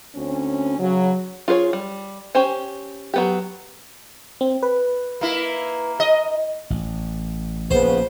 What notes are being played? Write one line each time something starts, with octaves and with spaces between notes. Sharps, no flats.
D2 C4 C#4
C#3 F#3
F4 G#4 A#4 C#5
G3
C#4 G4 C5 G#5
F#3 B3 G4
C4
B4
A#3 E4
D#5
A1
A#1 C#3 B3 C5